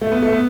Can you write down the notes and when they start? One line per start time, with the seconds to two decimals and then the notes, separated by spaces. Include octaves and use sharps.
0.01 A3
0.12 B3
0.22 A3
0.33 B3